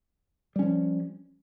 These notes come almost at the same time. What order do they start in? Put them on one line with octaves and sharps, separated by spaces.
G3 C#4 F3